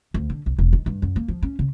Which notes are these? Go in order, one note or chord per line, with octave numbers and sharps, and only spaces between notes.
D2
D3
B1
E1
D#3
G2
F#2
A#3
F3
C#4
C#3